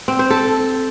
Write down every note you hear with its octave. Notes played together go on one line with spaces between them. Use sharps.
C4
C5
A4